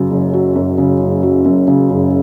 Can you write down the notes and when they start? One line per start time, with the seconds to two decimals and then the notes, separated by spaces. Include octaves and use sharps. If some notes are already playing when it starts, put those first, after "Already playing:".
Already playing: F#2 C#3 F#3
0.10 F#1
0.33 F#3
0.56 F#2
0.78 C#3
1.01 F#1
1.23 F#3
1.45 F#2
1.68 C#3
1.90 F#1